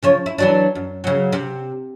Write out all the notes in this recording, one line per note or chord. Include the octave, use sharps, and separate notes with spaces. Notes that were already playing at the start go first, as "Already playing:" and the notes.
C#3 F3 C#5
E4
E3 F#3 D4
F#2
C#3 F#3
C3